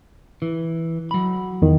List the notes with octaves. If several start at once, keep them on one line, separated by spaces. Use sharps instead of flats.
E3
F#3 B5
E2 D#3